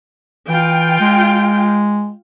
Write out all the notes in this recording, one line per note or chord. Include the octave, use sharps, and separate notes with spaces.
E3 F4 G5
G#3